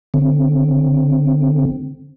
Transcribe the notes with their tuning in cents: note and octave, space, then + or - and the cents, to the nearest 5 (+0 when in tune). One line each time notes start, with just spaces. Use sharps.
D3 +0 C4 +0